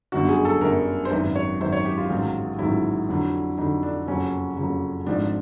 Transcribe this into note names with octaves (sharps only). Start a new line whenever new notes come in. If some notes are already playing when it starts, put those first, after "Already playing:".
G1 F#2 D3 F#4
G#4
A4
G1 F#2 D3 A#4
C5
G#1 F#2 D#3 B4
C#5
G#1 F#2 D#3 C5
C#5
G4
F4
A1 G#2 D#3 F#3
A1 G#2 D#3 F#3 E4
F2 D3 F#3
F2 D3 F#3 D#4
D4
F#1 F2 C#3 F#3 C#4
F#1 F2 C#3 F#3
G#1 G#2 F3 D4